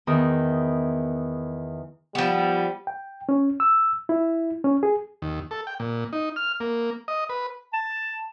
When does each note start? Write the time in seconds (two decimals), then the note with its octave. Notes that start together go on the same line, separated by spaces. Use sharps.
0.07 E2 D#3
2.15 F3 G3 B3
2.87 G5
3.29 C#4
3.60 E6
4.09 E4
4.64 C#4
4.83 G#4
5.22 D#2
5.51 A4
5.67 G5
5.80 A#2
6.13 D#4
6.36 F6
6.60 A#3
7.08 D#5
7.29 B4
7.73 A5